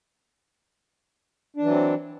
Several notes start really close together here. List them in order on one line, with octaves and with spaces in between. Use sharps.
D4 E3 F#3 C4